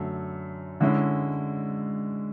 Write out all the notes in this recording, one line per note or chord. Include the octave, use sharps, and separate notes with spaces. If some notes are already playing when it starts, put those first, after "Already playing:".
Already playing: F#2 D3 A3
D3 G#3 C#4 E4